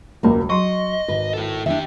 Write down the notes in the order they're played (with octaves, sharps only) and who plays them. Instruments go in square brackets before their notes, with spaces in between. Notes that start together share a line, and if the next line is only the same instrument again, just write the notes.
[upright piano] E1 C#2 F#3 [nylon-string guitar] A#3
[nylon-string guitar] F#3 [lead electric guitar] D#5 [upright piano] C6 C#6
[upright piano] G#1 [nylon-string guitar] B4
[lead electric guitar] E4 A4
[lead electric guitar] D#3 G4 [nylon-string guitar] D4 E4 E5